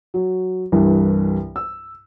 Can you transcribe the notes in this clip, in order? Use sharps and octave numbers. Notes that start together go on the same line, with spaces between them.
F#3
C2 G2 E3
E6